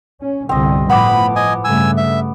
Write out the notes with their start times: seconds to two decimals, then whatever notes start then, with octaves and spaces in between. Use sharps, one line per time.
0.21 C#4
0.49 G1 C2 D3 C4 D#5
0.90 A2 F3 B3 B5 D6
1.36 D#5 G#5
1.64 G2 C#3 A3 G#5 E6
1.97 E5